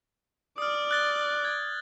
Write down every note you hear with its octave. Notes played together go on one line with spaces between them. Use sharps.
D5 D#6 F6
F#6 A6 G7
G#6